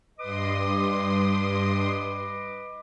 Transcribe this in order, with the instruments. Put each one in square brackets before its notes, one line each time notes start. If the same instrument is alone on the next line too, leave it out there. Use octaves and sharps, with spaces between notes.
[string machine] G2 C6 D#6 [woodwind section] B4 D#5 D6